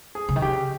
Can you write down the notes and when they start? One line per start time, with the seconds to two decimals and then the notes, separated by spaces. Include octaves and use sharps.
0.15 G#4
0.29 C#3
0.36 D#3
0.42 C#3 G4